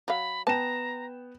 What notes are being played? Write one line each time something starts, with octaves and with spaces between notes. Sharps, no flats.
F#3 F5 B5
B3 G5 A5 A#5 E7